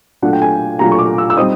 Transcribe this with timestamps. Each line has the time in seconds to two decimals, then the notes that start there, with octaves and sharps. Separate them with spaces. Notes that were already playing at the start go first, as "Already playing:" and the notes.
0.22 A#2 F#3 A3 D4 F#5
0.33 G5
0.42 G#5
0.79 A#2 F#3 A3 D4 A#5
0.92 C#6
0.99 D6
1.18 E6
1.30 E6
1.37 G3 C4 D#4 D#6